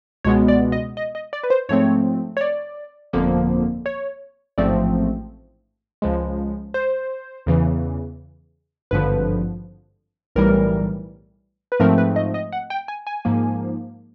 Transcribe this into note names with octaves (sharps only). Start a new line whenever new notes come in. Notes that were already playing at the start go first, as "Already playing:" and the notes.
C#2 B2 G#3 B3 C#5
D5
D#5
D#5
D#5
D5
B4
C5
G#2 F3 A3 C4 C#5
C#5
D5
G1 F2 D3 F3 A#3
C#5
A1 G#2 F3 A3 C4 D5
C#2 C#3 F3 G#3
C5
E2 C#3 E3
G#1 G2 D3 F3 B4
B1 A2 E3 G3 A#4
B4
G#2 F3 A3 C4 A#4
B4
D#5
D#5
F#5
G5
G#5
G#5
G#2 F3 A#3